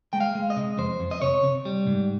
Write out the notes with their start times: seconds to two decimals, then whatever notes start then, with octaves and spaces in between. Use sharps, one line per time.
0.13 G#3 G5
0.20 F5
0.35 G#3
0.50 D#5
0.56 C3
0.78 F2 C5
1.00 F2
1.11 D#5
1.22 C3 C#5
1.44 C3
1.65 G3
1.87 G#2